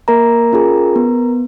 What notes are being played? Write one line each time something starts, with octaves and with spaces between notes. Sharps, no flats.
A#3 A#4 A#5
C#4 F4 G#4
B3